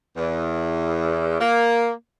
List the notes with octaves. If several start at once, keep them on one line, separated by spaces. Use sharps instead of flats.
E2
A#3